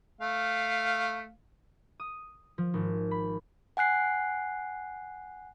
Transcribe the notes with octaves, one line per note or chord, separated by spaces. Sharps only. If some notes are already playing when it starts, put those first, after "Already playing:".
A3 F5
D#6
F3
G#1
B5
F#5 G#5 F#6 C7